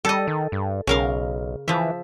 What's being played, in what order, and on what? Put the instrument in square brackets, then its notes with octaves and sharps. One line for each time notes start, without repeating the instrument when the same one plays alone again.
[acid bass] G3 [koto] A4 D#5
[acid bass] D#3
G2
[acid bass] B1 [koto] C#3 A#4 F5
[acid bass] E3 [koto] F3 E5